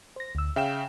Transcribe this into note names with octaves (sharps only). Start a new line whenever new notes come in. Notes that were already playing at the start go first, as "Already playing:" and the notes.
C5 A#6
D2 E6
C#3 E5 F5 G5 E7